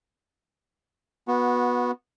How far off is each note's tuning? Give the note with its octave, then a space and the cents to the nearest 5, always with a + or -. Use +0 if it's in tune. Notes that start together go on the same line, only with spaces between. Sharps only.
B3 -10 F#4 -25